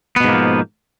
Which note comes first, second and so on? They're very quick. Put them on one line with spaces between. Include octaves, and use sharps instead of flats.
B3 B2 G#2 A#3 F3